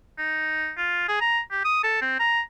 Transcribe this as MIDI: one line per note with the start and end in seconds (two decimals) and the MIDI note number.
0.18 0.72 63
0.77 1.07 65
1.08 1.17 68
1.21 1.40 82
1.51 1.61 67
1.65 1.79 87
1.83 1.97 69
2.01 2.15 60
2.19 2.40 82